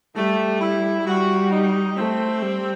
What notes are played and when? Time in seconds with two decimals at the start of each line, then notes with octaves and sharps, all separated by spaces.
0.16 G3 A3
0.61 E4
1.07 G3 F#4
1.51 D#4
1.97 A3 C4
2.42 G3